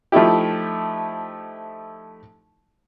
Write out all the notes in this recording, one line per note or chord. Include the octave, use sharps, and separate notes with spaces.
F3 A3 D#4 E4 G4